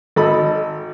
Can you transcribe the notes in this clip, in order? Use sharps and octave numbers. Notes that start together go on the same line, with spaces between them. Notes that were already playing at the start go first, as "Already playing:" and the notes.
G#1 A4 D#5 B5